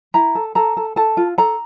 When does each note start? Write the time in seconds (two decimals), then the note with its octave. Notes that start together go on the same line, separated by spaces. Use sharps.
0.14 E4 A#5
0.35 A4
0.55 A4 A#5
0.77 A4
0.96 A4 A5
1.17 F4
1.38 A4 A#5